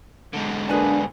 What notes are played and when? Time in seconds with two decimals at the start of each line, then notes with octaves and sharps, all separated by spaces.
0.34 G#2 D3
0.69 A#3 D4 G#4 B4 G#5